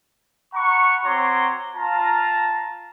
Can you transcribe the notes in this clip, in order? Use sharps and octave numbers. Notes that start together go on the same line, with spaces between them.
F#5 A#5 B5 C#6
C4 F#4 C#5 A#5 C6 D6
F4 A5 A#5